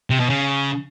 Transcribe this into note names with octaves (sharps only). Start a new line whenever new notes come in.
C3
B2
C#3